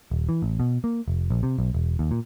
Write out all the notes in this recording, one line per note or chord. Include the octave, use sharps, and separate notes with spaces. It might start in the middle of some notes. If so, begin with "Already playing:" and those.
D#1
E3
A1
B2
A#3
F1
A#1
C3
B1
E1
D#2
A#2